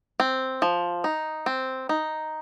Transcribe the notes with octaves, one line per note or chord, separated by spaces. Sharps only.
C4
F3
D#4
C4
D#4